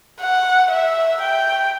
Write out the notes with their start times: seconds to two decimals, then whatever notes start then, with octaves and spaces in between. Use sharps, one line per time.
0.21 F#5
0.71 E5
1.22 G5